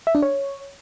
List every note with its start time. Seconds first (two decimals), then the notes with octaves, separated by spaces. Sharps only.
0.07 E5
0.15 D4
0.22 C#5